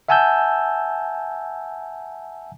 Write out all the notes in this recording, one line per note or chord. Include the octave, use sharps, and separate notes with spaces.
E5 F#5 G#5 A5 E6 G6